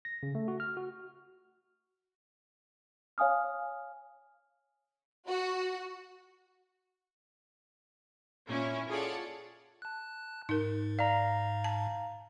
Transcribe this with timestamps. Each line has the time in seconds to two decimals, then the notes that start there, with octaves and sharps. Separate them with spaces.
0.05 A#6
0.23 C#3
0.35 A3
0.48 F#4
0.60 F6
0.77 F#4
3.18 C#5 F5 G#5 D#6 F6
5.27 F#4
8.47 A#2 C#4 E4
8.88 F4 G#4 A4 C#5 D5 F#5
9.82 A5 F#6
10.49 G#2 D#4 A#4
10.99 D5 F5 A#5
11.64 A5